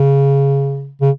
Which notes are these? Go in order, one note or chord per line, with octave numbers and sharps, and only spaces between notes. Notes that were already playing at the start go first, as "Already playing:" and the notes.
Already playing: C#3
C#3